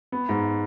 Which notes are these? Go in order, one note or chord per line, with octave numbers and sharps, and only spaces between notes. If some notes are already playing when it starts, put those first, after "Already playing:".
B3
G#2